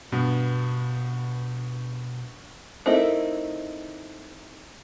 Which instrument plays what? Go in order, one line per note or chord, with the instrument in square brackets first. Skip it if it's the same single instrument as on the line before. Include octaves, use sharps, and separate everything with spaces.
[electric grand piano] G2 B3 [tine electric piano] B2
[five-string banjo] A3 C4 D#4 E4 A#4